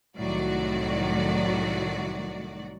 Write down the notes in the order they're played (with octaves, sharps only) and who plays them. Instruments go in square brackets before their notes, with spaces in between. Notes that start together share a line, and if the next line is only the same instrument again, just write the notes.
[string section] C2 A2 D#3 F#3 F#4 D5